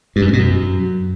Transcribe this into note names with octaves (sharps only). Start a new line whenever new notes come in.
G2
F#2
G2
B2
F#2